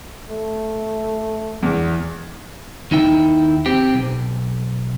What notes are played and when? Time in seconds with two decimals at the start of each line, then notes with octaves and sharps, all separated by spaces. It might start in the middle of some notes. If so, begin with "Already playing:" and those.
0.29 A3
1.63 E2
2.91 D#2 D#4 E4 G5
3.66 C4 G4
3.94 B1